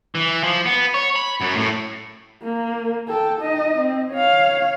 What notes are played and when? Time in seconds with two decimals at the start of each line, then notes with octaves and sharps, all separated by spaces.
0.15 E3
0.44 F3
0.66 B3
0.94 C#5
1.16 B5
1.41 F#2
1.55 A2
2.43 A#3
3.08 A4 G5
3.40 D#4 D#5
3.77 C4
4.11 C#5 F5